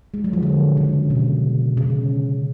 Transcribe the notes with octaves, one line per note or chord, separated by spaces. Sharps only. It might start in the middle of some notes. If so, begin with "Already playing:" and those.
G#3
F#3
F3
D3
C#3
B2
C#3